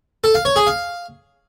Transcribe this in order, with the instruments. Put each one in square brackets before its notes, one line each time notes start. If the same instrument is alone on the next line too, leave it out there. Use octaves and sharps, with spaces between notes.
[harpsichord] A4
F5
C#5
G#4
F5